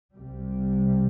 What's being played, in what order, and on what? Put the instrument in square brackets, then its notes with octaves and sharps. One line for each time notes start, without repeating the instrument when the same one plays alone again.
[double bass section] C2 C3 G3